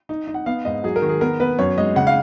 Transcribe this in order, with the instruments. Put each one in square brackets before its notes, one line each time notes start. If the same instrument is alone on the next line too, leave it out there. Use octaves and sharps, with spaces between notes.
[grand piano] D#4
D#4
F#5
B3 F5
G#2 D#5
F#3 G#4
A#4
D#3
G#4
B3 A#4
B3 B4
F#2 C#5
G#3 D#5
C#3 F#5
F5